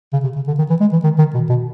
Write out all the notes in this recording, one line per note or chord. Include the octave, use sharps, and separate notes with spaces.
C#3
C3
C#3
D3
D#3
E3
G#3
E3
D#3
D#3
B2
B2